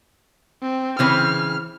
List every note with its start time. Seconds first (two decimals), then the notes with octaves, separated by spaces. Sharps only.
0.62 C4
0.99 C#3 E3 C4 F6